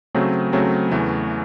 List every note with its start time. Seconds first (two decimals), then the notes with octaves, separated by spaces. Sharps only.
0.15 C#3 F#3 A3 C4
0.53 C#3 F#3 A3 C4
0.92 E2 C#3 E3 A3